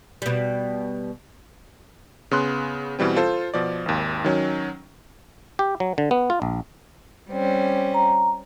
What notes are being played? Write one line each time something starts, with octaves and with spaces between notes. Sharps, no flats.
B2 G3
C#3 B3 C6 F#6
B2 E3 G3 C4
F4 A4 C5
B2 F3 D5
G#1 D#2
D#3 F#3 C#4
G4
F#3
D3
B3
F4
A#1
G3 C4 C#4
A#5